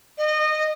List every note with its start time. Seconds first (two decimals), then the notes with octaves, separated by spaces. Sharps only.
0.18 D#5